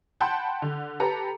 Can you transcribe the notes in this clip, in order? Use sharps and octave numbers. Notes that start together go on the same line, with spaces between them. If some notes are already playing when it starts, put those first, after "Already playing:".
F#5 G5 A5 B5 C6 G6
D3
G4 A4 B4 A#5